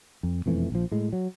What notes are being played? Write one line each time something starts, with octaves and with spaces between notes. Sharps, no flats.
F2
E1 F2 E3 A3
A#1 F3
A2 G#3
F#3